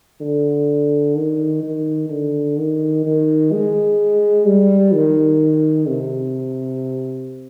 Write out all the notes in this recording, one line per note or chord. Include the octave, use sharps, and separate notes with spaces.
D3
D#3
D#3
D3
D#3
D#3
G#3
G3
D#3
C3